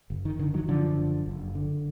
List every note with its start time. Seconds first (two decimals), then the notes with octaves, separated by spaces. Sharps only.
0.10 F#1
0.25 D#3
0.39 D3 D#3
0.54 D#3 F#3
0.68 F#2 D3 F3
0.97 F#1
1.26 F#1
1.55 D3